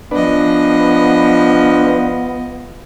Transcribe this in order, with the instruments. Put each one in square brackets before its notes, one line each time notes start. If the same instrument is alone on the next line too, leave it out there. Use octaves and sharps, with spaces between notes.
[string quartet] F3 D#5 [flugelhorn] B3 [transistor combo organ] D4 B4